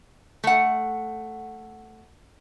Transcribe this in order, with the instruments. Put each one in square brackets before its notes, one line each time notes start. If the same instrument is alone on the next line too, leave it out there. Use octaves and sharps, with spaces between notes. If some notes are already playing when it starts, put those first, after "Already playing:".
[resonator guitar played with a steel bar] A3 F#5